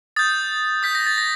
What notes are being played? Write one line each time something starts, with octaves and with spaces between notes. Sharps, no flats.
D#6 G6 A6
D#6 G6 B6
A#6
A6
A#6